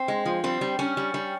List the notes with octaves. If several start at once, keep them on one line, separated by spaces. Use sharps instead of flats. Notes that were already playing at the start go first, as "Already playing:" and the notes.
Already playing: C4
G#3
F3
G3 C4
G3
G3 C#4
G3
G3